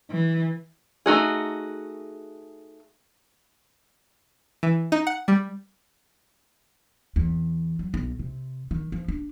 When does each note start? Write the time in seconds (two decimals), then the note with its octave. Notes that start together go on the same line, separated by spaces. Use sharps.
0.11 E3
1.06 A3 D#4 F#4 G#4
4.63 E3
4.92 D#4
5.07 F#5
5.28 G3
7.16 E2
7.79 F#3
7.94 B1
8.19 C3
8.71 D#3
8.92 F3
9.08 D4